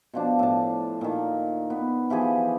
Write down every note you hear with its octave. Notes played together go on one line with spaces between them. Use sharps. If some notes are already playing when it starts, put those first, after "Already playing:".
B2 F3 D4
A2 A5
A#2 D#3
B3
E3 F3 G4 G#4